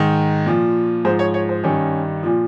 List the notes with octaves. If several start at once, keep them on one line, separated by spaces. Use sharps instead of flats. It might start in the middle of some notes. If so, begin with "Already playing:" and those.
Already playing: G#2 D#3
A#2 F3
G#2 F3 C5
C#5
C#5
C5
G2 D#3 C#4
A#2 F3